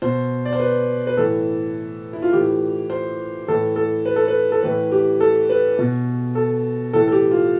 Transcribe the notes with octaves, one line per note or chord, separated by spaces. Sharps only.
B2 C5
D5
C5
B4
B4
A2 E3 A4
E4
F4
A2 E3 G4
C5
A2 E3 A4
A4
B4
A4
B4
A4
A2 E3 B4
G4
A4
B4
B2
A4
A2 E3 A4
A4
G4
F4